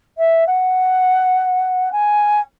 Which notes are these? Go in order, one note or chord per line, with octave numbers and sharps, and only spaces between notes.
E5
F#5
G#5